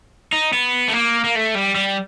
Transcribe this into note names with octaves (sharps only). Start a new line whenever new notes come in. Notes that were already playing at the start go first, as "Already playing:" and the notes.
D#4
B3
A3
A#3
A#3
A3
G3
G3